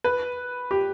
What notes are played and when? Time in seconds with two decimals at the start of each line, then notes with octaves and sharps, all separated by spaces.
0.04 B4
0.71 G4